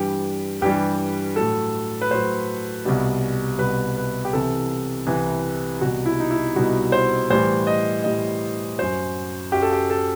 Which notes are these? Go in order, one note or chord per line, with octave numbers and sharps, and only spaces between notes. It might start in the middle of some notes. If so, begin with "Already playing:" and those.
Already playing: G2 E3 G3 G4
G2 E3 G3 G4
A2 F#3 A4
B4
A2 F#3 C5
C2 B2 G3
C2 B2 G3 B4
B4
G4
C2 C3 E3 A4
C2 C3 E3
C2 B2 G3 F#4
E4
D#4
E4
C2 B2 G3 F#4
C5
A2 E3 G3 C5
D#5
A2 E3 G3 D#5
F#2 F#3 C5
F#2 F#3 G4
A4
G4
A4